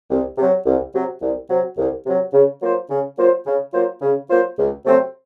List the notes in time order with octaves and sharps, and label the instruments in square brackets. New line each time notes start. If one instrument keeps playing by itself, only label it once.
[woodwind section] C2
C3 F#3
C2
C3 F#3
C2
C3 F#3
C2
C3 F#3
C#3
F#3 A#3 F4 C5
C#3
F#3 A#3 F4 C5
C#3
F#3 A#3 F4 C5
C#3
F#3 A#3 F4 C5
C#2
C3 F#3 A3 C4